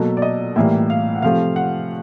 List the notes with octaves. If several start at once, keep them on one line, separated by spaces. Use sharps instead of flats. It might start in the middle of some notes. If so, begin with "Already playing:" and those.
Already playing: B2 F#3 A#3 A4
D5
D#5
A2 E3 G3 A#3 E5
F5
F#5
C3 F3 A3 F5
F#5